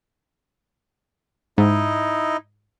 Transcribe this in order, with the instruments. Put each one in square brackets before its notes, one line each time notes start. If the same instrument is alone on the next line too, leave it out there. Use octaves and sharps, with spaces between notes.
[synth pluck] G#2 [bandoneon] D#4 E4 D#5